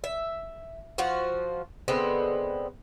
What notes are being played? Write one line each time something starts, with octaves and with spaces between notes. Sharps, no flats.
E5
F3 F4 F#4
D3 G#3 B3 C4